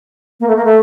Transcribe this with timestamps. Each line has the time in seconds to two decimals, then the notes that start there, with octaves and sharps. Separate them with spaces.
0.40 A#3
0.48 A3
0.57 A#3
0.65 A3